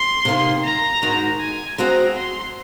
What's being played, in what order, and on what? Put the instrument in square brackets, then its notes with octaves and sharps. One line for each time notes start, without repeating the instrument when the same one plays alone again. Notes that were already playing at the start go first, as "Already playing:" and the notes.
Already playing: [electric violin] C6
[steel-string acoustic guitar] C3 D#3 A#3 D#4
[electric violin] A#5
[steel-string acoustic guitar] G#2 D#3 G#3 D#4 F#4
[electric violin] G#5
[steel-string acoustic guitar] G#3 C4 F#4 C5 D#5 [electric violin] A#5
[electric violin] C6